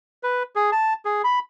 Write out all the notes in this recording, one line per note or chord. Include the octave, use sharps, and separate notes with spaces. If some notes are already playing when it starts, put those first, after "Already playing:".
B4
G#4
A5
G#4
B5